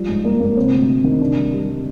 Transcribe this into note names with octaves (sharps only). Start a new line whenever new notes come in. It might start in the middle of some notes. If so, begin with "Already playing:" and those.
Already playing: F3 G3
G#2
G3 A#3
G#2 A#3
C3 C4
D2
D2
D#3
C3 D4
C2
C2
G3